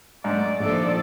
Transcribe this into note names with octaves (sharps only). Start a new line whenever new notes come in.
G#2 F#3 A3 D5
A#1 D#3 F3 A4 D5